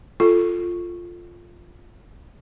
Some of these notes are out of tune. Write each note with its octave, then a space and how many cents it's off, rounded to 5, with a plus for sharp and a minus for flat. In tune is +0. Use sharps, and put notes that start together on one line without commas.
F4 +0 A4 +0